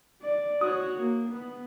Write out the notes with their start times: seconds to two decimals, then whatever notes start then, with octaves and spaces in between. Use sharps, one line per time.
0.22 D5
0.61 F#4 C#5 D#6
0.97 A#3
1.30 B3